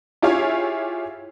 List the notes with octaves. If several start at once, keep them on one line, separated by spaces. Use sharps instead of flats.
E4 F4 G4 G#4 C#5 F5